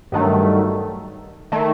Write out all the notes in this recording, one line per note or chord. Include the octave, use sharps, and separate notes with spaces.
G2 D#3 F#3 A3
D#3 A3